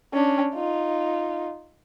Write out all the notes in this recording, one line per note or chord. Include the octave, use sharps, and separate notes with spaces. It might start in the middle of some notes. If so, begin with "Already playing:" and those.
C#4 D4
D#4 F4